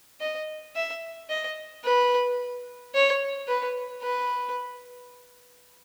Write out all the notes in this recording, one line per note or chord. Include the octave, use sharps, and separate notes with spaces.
D#5
E5
D#5
B4
C#5
B4
B4